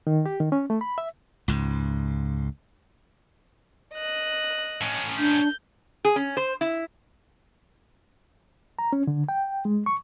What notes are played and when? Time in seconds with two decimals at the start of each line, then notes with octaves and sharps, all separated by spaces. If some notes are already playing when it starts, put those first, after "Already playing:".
0.07 D#3
0.26 G4
0.40 D#3
0.52 C#4
0.70 A3
0.81 B5
0.98 E5
1.48 C#2 G#2
3.94 D#5 F#6
4.81 A2 C#4
5.19 D4 G6
6.05 G#4
6.16 C#4
6.37 C5
6.61 E4
8.79 A#5
8.93 C#4
9.07 D3
9.29 G5
9.65 G#3
9.86 C#6